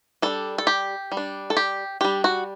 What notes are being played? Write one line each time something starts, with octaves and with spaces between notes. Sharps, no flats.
G3 D4 A4
A4
G4
G3
D4
A4
G4
G3 D4 G4
F#4